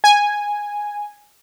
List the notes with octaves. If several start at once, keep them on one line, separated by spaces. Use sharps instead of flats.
G#5